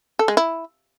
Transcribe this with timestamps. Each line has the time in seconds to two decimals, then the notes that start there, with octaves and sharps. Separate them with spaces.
0.19 A4
0.28 G#3
0.37 E4